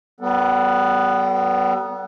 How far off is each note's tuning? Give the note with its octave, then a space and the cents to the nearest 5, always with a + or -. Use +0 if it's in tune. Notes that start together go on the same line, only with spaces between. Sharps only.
G3 -35 B3 +0 A4 +15